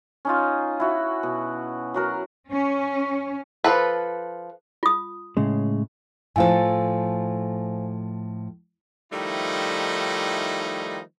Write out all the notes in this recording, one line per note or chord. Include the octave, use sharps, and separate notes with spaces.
C#4 D#4 F4
E4 F#4
B2
F#3 F#4 A#4
C#4
F3 A4 B4
F4 D#6
A2 C#3 G#3
A2 F3 A4 C5 F5 G#5
D#3 F3 G3 A3 D#4 E4